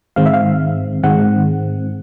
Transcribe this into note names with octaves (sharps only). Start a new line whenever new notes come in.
G#2 D#3 G#3 C4 F5
E5
F5
G#2 D#3 G#3 C4 F#5